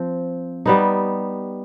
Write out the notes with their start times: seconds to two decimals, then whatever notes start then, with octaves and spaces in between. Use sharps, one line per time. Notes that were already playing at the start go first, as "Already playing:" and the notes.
Already playing: F3 C4
0.66 G3 B3 D#4